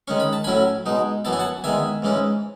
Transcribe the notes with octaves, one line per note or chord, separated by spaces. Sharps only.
D#3 G#3 C#4 C#6
B5
A5
A2 F#3 C#4 E4 G#5 B5
B2 G#3 D#4
F#2 E3 B3 E4 A5
G#5
F#5 A5
E2 D#3 G#3 E5 G#5
G#2 E3 G#3 C#4 E4